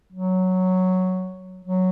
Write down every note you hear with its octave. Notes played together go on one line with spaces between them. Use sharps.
F#3
F#3